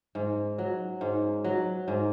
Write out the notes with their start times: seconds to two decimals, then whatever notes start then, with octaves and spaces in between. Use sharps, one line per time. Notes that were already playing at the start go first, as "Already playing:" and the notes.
0.15 G#2
0.58 F#3
1.01 G#2
1.44 F#3
1.88 G#2